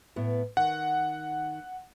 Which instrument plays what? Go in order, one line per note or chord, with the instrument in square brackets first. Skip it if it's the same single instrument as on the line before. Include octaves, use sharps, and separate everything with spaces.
[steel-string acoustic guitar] A2 B3
[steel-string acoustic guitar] D#3 [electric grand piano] F#5